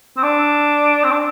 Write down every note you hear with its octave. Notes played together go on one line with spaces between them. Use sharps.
C4
D4
C4
D4